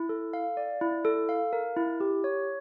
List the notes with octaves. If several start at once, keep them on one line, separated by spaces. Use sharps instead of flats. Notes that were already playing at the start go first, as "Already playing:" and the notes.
Already playing: E4
A4
F5
D5
E4
A4
F5
A#4
E4
G4
C#5